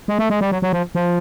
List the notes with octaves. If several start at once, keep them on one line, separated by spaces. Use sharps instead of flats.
G#3
A3
G#3
G3
F#3
F#3
F3
F3